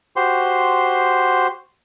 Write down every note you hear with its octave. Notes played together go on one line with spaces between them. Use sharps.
F#4 G4 C5 C6